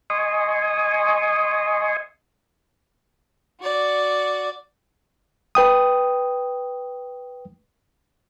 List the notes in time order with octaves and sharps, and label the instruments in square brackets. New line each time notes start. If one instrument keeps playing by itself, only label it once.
[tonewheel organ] D#5 G#5 C6 C#6 D#6
[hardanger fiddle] F#4 D5
[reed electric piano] B4 G5 D#6